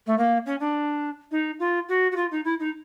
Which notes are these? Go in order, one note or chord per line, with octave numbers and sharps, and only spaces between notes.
A3
A#3
C#4
D4
D#4
F4
F#4
F#4
F4
D#4
E4
D#4